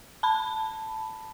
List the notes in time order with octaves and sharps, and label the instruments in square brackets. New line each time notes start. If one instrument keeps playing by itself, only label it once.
[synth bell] A5 B5